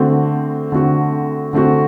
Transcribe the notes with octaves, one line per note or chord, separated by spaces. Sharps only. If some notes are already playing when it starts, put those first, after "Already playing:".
Already playing: D3 A3 C4 F#4
D3 A3 C4 F#4
D3 A3 C4 F#4